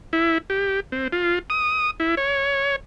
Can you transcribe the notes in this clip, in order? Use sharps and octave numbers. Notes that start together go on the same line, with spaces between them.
E4
G4
C4
F4
D#6
E4
C#5